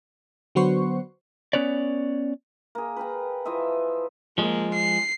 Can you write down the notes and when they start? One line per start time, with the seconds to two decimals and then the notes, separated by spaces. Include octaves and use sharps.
0.55 D3 F#3 B3 F#4 C5 C#6
1.53 B3 C#4 B4 C#5 D5
2.75 A#3 G#4
2.96 B4 F5 G5 A#5
3.45 E3 F3 D#5 E5
4.38 F3 G#3 A#3
4.74 C7